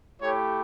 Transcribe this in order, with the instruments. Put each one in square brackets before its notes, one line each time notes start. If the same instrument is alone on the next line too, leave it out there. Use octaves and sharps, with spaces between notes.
[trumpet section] A3 E4 G4 C#5